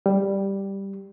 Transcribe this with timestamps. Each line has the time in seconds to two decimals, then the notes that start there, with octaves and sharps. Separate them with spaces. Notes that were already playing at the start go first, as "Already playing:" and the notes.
0.06 G3